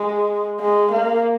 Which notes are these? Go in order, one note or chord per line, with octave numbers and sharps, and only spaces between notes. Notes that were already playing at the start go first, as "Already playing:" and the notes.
Already playing: G#3
G#3
A#3